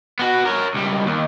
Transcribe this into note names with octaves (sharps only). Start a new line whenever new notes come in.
B3 F#4
A#4 C#5
C#2 G3
D#2